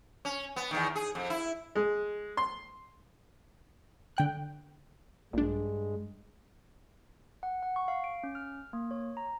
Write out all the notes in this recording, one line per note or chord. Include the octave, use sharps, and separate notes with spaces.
C#4
B3
E2 D3 D#3
G#4
F2
E4
G#3
C6
D3 G5 F#6
A#1 G2 G#3 D4
F#5
F#5
C#6
F5
D7
C#4
F6
A#3
C#5
A#5